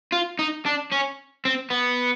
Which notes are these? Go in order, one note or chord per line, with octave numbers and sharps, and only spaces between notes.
F4
D#4
D4
C#4
C4
B3